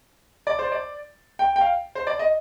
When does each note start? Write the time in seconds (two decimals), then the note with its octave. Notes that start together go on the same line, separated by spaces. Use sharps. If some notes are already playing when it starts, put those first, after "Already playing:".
0.47 D5
0.59 C5
0.72 D5
1.39 G5
1.56 G5
1.61 F5
1.95 C5
2.07 D5
2.19 D#5